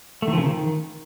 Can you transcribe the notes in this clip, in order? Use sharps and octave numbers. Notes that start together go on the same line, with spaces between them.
A3
D#3
F3
C#3
D#3